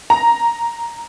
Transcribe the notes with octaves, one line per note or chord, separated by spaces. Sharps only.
A#5